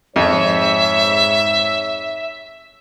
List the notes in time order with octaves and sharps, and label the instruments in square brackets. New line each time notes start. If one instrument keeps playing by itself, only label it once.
[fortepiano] F2 [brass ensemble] G#2 C#5 [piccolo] E5